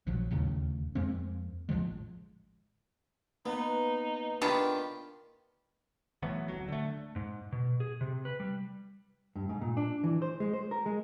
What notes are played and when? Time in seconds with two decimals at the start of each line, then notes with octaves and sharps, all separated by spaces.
0.07 A#1 F3 F#3
0.30 D1 D#2 A2 C#3
0.95 F2 G#3 A#3 C4
1.69 A1 D3 F3 G#3
3.46 A#3 B3 D#4 B4
4.42 D#3 B3 D4 F4 G4
6.22 E3 F#3 A3 B3
6.48 D1 A#1 F#3
6.68 D3 A3
7.16 G#2
7.52 B2
7.80 G#4
8.01 C3
8.25 B4
8.40 G3
9.36 G2
9.49 G#2
9.61 A#2
9.77 D4
10.04 E3
10.22 C5
10.40 G#3
10.53 C5
10.71 A#4
10.86 G#3